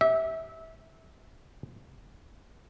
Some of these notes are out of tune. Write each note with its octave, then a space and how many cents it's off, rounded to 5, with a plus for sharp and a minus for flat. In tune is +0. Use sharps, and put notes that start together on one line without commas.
G4 +0 E5 -25